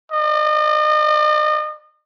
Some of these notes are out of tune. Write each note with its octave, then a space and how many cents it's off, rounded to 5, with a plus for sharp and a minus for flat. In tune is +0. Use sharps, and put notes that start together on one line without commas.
D#5 -40